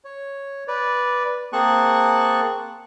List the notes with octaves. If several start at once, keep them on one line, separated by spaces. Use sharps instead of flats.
C#5
B4 D5
A#3 C4 G#4 A5 C#6 F#6